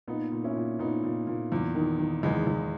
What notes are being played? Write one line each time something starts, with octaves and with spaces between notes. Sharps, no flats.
A#2 B3 D#4
A#2
C#4 E4
A#2
A#2 B3 D#4
A#2
A#2
E2
D#3
D#3
E2 G#3 B3
E2